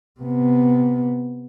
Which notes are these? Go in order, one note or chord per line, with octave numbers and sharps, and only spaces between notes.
C3 B3